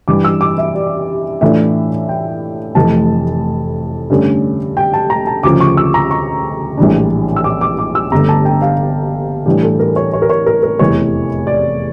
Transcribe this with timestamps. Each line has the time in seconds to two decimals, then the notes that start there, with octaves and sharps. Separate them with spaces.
0.08 G2 E3 G3 D6
0.24 E6
0.41 D6
0.58 E5
0.75 D5
1.41 A2 E3 A3 D4 F4 E5
2.09 G5
2.75 F1 F2 E3 A3 A5
4.10 G2 D3 A3 C#4
4.77 G5
4.94 A5
5.10 A#5
5.27 A5
5.43 D2 C#3 F3 D6
5.61 C#6
5.77 E6
5.94 A#5
6.11 C#6
6.78 A#1 A2 E3 G3 D4
7.36 E6
7.44 D6
7.61 D6
7.79 D6
7.95 E6
8.12 G1 G2 D3 A3 A#5
8.29 A5
8.45 G5
8.62 F5
9.46 A2 E3 G3 D4 G4
9.63 A4
9.79 A#4
9.96 C#5
10.13 C#5
10.22 A#4
10.29 C#5
10.46 A#4
10.63 A#4
10.79 F1 E2 E3 C#5
11.47 D5